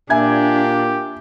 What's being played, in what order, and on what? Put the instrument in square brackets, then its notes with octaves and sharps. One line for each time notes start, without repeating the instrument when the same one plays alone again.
[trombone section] A#2 A#3 [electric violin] D4 [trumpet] G4 [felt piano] E5 G#5 G#6